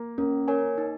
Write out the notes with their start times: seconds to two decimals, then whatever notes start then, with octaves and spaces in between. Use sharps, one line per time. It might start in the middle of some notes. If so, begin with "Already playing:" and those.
Already playing: A#3
0.18 A#3 C#4
0.48 A#4 C#5 G#5
0.78 D#4